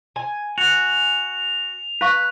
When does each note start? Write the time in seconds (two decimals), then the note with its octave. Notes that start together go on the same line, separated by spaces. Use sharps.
0.16 G#5
0.58 F#4 F7
2.01 E4 B4 F5 C#6